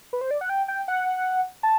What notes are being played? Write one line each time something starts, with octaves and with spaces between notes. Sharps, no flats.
B4
C5
D5
F#5
G5
G5
F#5
A5